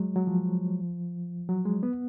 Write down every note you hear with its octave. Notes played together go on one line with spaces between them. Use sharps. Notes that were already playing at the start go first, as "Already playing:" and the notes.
Already playing: F#3 G#3
F#3
F3
F#3
G#3
B3